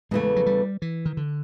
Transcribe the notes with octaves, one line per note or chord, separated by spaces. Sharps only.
E2 C#3 E3 G#3 A3
F#3
G3
E3
D#3
D3